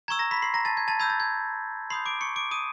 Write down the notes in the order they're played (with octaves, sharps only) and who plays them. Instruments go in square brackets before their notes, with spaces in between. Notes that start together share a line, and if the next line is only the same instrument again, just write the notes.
[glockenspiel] A#5 C#6 E6 G#6
A#5 A#6
B5 B6
C6 C7
A#5 A#6
A5 A6
G#6
A5 A6
B5 E6 G6 G#6
A6
G#6
B5 C6 D#6 G6 C7
D6 D7
C#6 C#7
D6 D7
D#6 D#7